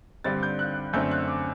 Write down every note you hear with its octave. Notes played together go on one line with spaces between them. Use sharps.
G2 D3 G3 C4 A6
G6
F#6
F#2 D3 A3 C4 G6
F#6
D6